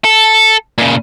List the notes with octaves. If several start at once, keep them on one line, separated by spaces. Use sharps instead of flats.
A4
A#2 C#3